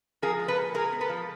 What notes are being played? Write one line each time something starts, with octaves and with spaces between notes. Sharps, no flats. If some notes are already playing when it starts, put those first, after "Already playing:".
F3 G#4 A#4
G#3
A4 B4
A#2
G#3 G#4 A#4
B3
A4 B4
F3